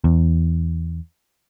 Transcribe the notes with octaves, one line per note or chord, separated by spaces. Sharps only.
E2